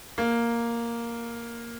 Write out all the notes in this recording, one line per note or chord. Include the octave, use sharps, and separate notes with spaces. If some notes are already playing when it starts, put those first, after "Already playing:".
A#3